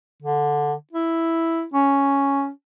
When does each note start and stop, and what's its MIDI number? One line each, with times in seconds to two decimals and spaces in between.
0.22 0.73 50
0.92 1.64 64
1.74 2.49 61